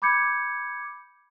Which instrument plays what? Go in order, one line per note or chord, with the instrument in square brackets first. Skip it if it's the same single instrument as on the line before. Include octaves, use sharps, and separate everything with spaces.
[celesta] B5 D6 G6 G#6 C#7